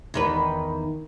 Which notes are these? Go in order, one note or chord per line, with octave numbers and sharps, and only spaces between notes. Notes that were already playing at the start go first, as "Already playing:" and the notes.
E2 D#3 B4